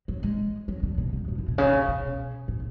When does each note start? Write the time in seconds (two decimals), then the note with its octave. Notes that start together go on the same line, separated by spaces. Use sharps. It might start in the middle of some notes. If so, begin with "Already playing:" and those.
0.08 F#3
0.23 G#3
0.68 F#3
0.83 D3
0.98 B2
1.13 G#2
1.28 F#2
1.38 F#2
1.48 B2
1.58 C#3
1.88 B2
2.48 A2